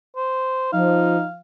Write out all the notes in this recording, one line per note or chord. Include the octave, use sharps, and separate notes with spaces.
C5
F3 D#4 F5